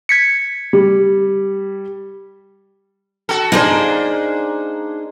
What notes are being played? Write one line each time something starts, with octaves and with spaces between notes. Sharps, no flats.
G#6 B6 C#7
G3
F#4 A4
A#3 D4 D#4 G#4 C5